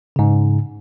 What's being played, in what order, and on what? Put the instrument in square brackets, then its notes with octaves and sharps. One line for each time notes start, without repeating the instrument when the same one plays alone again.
[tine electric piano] G#2 C#3